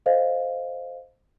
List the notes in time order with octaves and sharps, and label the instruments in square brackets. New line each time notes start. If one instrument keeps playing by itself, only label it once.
[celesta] A4 C5 D#5 F5